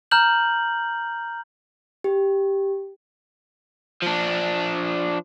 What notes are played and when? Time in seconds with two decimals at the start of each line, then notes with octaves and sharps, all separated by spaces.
0.11 A#5 F6 G6 F#7
2.04 G4
4.02 F3 D4